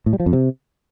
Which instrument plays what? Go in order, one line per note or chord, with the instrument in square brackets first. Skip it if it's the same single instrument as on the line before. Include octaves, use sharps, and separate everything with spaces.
[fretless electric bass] A2
G3
F3
F2
C3